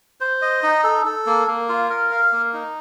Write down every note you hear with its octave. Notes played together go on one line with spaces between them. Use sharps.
C5
D#5
D#4
A4
A4
A#3
A#3
F4
A#4
F5
A#3
D#4